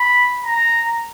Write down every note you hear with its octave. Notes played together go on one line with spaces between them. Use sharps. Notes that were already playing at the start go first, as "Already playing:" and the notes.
Already playing: B5
A#5